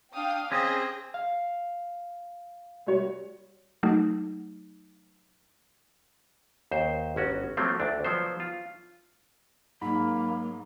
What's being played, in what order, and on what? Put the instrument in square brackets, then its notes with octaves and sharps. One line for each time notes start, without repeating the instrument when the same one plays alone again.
[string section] D4 F5 G5 [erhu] D#6
[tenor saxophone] C4 [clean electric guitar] C#4 G4 D#5 [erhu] G#4 [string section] A#6
[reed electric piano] F5
[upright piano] G3 F#4 C#5
[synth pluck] F#3 A3 D#4
[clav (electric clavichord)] D#2 C5
G1 C#4 F#4
F3 F#3 A3 A#3 C4
D2 D4
F3 F#3 B3 C5
F4
[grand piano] G#2 [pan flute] F#3 [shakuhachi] A#3 [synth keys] B5